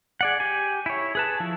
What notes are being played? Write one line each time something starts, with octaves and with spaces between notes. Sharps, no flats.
G#4 D5 F#5
G4 G#5
E4 C#5
G#4 B4 A5
F3 E4